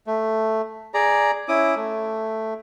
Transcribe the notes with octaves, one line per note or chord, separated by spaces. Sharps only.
A3
G#4 D5 A#5
C#4 E4 D6 D#6
A3